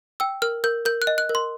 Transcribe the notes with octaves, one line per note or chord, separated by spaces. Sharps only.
G5 E6
A#4 F6
A#4 G6
A#4 G6
F#6
D#5
F#6
A#4
C6